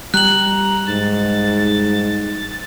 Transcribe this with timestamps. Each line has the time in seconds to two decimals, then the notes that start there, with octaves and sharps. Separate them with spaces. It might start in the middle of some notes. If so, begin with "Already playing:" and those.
0.14 G3 A#5 F#6 F#7
0.87 G#2 A6